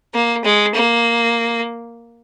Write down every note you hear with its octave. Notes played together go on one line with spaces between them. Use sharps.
A#3
G#3
A#3